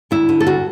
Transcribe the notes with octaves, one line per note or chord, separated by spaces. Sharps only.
D2 E4
D3
A4
D2 F#4